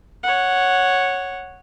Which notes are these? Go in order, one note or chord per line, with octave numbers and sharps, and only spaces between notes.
C#5 F#5